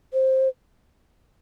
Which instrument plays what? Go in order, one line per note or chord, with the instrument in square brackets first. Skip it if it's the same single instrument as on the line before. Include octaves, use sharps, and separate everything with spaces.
[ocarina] C5